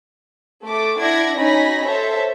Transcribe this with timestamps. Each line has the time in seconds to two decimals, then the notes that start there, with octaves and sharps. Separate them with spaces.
0.65 A3 A4 D6
0.98 D4 E4 D5 F#5 G#6 A#6
1.38 C#4 D#4 F#4 G#5 B5 A#6
1.84 A4 C5 C#5 E5